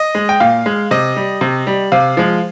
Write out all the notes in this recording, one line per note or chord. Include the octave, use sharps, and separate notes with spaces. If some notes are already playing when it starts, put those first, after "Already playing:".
Already playing: D#5
G#3
G5
A#2 F5
G#3
C3 D#5
G3
C3
G3
C3 F5
F3 G#3